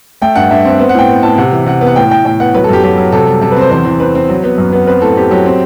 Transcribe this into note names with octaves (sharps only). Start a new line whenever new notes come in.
A3 G5
G2 F#5
G2 E5
C4
B3 C5
F#5
A2 G5
B3
A2 A5
C3 F#5
E3
C3 F#5
B3
F#5
A2 G5
A2 G5
A2 G5
B3 F#5
F#3 B4
A4
F#2 G4
F#3 G4
F#3
C3 A4
G3
C3 A4
B4
C4 C5
E2 C5
E2
C4 B4
C4
F#3
B3
F#2
B3
C4 B4
A2 A4
C4 G4
F#3 G4
C4